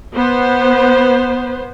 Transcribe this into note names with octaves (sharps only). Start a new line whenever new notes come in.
B3 C5